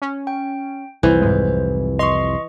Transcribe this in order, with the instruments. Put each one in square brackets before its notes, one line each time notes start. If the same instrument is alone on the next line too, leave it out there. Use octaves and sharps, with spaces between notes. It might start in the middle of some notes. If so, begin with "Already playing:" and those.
[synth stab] C#4
[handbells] G5
[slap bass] C2 F2 [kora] E3 [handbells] C5
[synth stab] G#2 G#3
[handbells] D#5 C#6 [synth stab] C6